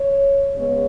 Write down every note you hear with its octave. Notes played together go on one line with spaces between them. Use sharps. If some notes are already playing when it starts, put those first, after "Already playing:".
Already playing: C#5
C#3 G#3 B3 C#5